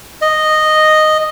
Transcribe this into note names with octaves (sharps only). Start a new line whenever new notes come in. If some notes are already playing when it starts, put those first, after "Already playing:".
D#5